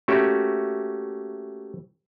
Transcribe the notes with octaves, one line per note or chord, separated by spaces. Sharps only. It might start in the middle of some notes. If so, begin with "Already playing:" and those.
A3 A#3 C#4 F#4 G4 E5